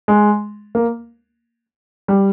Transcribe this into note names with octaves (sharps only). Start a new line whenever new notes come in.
G#3
A#3
G3